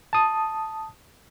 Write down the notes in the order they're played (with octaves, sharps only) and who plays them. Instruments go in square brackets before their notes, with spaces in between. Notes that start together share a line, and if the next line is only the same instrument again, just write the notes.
[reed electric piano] A5 D#6